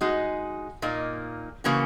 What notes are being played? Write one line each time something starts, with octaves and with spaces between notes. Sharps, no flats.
G#3 D#4 F#4
A#2 A#3 D#4
C#3 E3 A#3 C#4 F#4